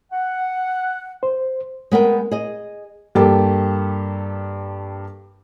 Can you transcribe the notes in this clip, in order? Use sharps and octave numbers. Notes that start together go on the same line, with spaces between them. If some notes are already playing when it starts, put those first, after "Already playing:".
F#5
C5
G#3 B3 A#4 G5
G#4 D#5
G2 A#3 G4 A4